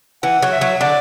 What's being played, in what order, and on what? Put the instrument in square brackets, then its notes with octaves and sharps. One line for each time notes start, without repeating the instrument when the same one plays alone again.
[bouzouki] E3 [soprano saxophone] F#5
[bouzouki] F#3
[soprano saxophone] E5
[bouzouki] F#3
[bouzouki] D3 [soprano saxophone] D5